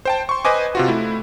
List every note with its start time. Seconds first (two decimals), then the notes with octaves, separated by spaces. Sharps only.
0.05 C5 G5 A5
0.29 C6 C#6
0.45 B4 C5 D#5 G#5 D6
0.75 C3 F4 F#4
0.88 A3 E4